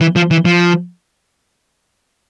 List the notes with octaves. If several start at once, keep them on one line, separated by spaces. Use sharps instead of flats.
E3
F3
E3
F3